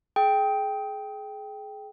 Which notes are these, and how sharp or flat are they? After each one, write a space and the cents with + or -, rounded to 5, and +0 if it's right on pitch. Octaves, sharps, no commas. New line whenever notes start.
G#4 +30 G5 +0